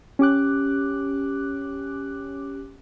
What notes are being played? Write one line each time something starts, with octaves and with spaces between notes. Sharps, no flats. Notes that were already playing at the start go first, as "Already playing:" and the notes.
C#4 G4 D6 F#6